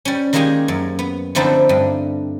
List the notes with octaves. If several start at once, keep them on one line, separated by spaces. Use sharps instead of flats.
G3 C#4
D#3 G#3 A#3 G4 G#4 G#5
F#2
B3
D3 F3 A3 C4 D#4 E4
G2